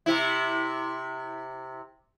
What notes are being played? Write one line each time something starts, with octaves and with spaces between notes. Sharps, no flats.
C3 E4